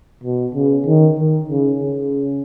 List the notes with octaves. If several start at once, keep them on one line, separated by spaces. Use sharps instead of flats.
B2
C#3
D#3
D#3
C#3
C#3